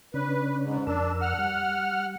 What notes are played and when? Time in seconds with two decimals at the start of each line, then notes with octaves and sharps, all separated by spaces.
0.14 C#3 C#4 D4 B4
0.63 G#2
0.87 F2 D4 A#4 E6
1.21 F#5 F6
1.38 G3